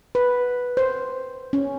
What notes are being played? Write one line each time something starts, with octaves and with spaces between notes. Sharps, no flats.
B4
C5
C#4